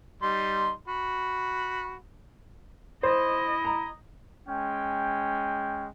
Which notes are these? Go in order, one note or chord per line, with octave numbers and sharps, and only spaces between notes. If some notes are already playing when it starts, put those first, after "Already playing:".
G3 D#4 C6
F#4 B5
E4 C5 D#5
A#5
G#3 C#4 G5